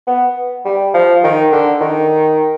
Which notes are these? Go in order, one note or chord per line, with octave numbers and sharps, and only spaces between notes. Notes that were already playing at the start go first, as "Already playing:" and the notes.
B3
G3
F3
D#3
D3
D#3